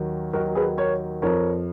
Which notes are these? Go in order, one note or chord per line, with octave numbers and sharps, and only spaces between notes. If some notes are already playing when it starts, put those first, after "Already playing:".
Already playing: D#2 D#3 F#3
D#2 D#3 F#3 F#4 A#4
G#4 B4
A#4 C#5
F2 F3 A#4 C#5